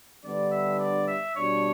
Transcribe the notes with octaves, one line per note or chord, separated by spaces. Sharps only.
D3 G3 B3 D4 D5
E5
D5
E5
B2 G3 D4 C#5